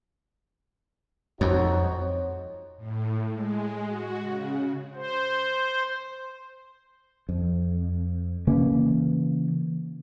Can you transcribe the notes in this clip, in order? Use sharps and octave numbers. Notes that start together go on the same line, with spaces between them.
F2 D#4 F#4 C#5
A2
G#3
F#4
C#3
C5
F2
C#3 E3 A#3 C#4